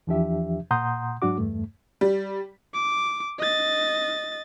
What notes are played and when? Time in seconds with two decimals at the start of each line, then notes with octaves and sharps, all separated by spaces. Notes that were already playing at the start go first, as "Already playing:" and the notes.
0.07 E2 E3 F3 D4 G4 E5
0.71 A#2 F#5 A#5 C6 D#6 G6
1.22 G#2 F#3 D4 F#4 D6
1.38 E2 G2 A3
2.01 G3
2.74 D6
3.39 D#5 A6